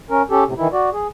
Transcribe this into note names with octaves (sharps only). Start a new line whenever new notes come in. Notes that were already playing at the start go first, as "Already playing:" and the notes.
C#4 A#4
C#4 G4 A4
A2 C3
D#3 E3 E4
F#4 D5
G#4